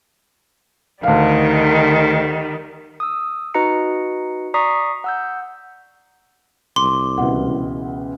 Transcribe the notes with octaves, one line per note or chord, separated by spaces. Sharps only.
D2 D#3 G3 F5
D#6 E6
D#4 F#4 B4 D#5 A#5 C#7
D5 A#5 C#6 D#6 B6 C7
F#5 E6 G6
C2 C6 D6
C#2 B2 E3 F#5